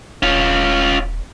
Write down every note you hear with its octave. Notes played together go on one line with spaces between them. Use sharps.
D#1 C#4 F4